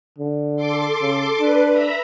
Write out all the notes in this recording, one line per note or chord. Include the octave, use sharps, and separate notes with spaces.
D3
A4 C6 D6
C#3
D4 B4
E5 A#5 B5